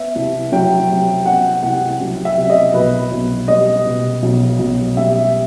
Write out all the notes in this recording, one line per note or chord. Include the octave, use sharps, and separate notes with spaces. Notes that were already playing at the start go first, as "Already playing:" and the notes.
Already playing: B3 E5
C2
F#3 G5
C3
B3 F#5
C2 F#5
F#3
E5
C3
D#5
B1 B4
B1
G3 D#5
B2
B1
B1
G3 E5